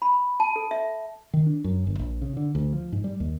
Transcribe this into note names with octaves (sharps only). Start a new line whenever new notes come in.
B5
A5
A4
E5
D#3
D4
F#2
G1
A#1
C#3
D3
D2
F3
G#2
G3
D#2